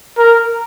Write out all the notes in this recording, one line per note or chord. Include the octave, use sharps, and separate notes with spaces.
A#4